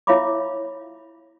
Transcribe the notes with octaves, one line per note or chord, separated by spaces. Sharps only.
E4 C#5 E5 F5 B5 D6